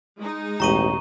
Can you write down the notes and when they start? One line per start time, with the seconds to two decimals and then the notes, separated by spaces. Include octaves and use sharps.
0.18 G#3 D#4
0.60 E1 A1 G4 A#5 C#6 D#7 F#7